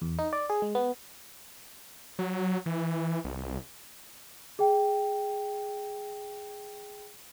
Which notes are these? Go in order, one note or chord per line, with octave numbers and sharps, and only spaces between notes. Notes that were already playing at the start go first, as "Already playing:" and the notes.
E2
D#4
D5
G#4
G#3
B3
F#3
E3
C2
G#4 G5